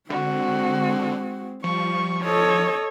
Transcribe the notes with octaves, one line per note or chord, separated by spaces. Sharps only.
D3 G#3 C4 F#4
F3 G3 C#6
A4 C#5 D#5